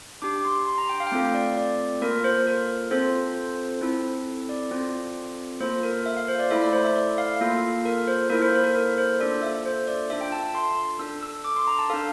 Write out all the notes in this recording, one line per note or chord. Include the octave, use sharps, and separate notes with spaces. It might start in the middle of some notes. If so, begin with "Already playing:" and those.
D4 G4 D6
C6
C6
A#5
G5
F5
G5
A3 C4 F4 A4 F5
D5
D5
A#3 F4 A4 A#4
C5
A#4
C4 F4 A4 C5
C4 E4 A4
D5
C4 F4 A4
A#3 F4 A4 C5
A#4
E5
F5
C5
D5
A3 E4 A4 E5
D5
C5
E5
D5
F5
A#3 F4 A4
A#4
C5
A#3 E4 A4 A#4
C5
C5
A#4
A#4
C5
A#3 D4 F4 A4 D5
E5
C5
D5
D4 F4 A4 E5
G5
A5
C6
D4 A4 E6
E6
D6
C6
A#5
A5
D4 A4 F5